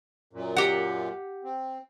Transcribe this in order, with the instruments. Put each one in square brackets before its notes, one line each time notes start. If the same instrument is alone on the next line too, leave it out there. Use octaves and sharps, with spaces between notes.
[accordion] F#2 A#2
[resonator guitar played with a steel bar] G4 F#5
[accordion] C4